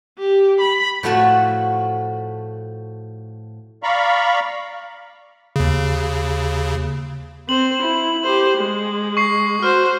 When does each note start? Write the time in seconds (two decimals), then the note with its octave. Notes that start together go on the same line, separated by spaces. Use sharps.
0.19 G4
0.61 B5
1.03 A2 F3 A3 F#4 A5
3.83 D5 F5 A#5 B5 C#6
5.56 D#2 C#3
7.49 C4 C5 F#7
7.83 E4
8.23 G4 C5
8.58 G#3
9.17 C#6 C7
9.63 F#4 C5 F6